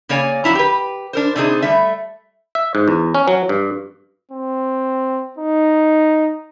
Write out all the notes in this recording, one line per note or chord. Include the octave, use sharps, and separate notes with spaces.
C#3 A#3 C#5 D5 G#5
F2 F3 F#3 E4 A#5
G4 B4
D4 A#4 C5
C3 A3 C4 D4 D#4 G#4
G3 A3 E5
E5
G#2
E2
C#4
F#3
G2
C4
D#4